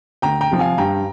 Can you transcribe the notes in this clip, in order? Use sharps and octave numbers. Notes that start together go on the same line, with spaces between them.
D2 G5 A#5
G5 A#5
C3 F3
F5 G#5
G2 G5 A#5